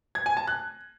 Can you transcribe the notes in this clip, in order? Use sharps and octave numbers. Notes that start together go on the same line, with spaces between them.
G#6
G#5
A5
F#6